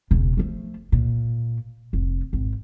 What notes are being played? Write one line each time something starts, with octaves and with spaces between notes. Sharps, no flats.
E1 C#3
F3 A3
A#2
F1
G#1